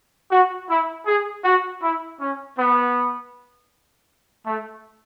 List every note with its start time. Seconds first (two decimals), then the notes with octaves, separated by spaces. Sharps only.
0.31 F#4
0.69 E4
1.06 G#4
1.44 F#4
1.82 E4
2.20 C#4
2.58 B3
4.46 A3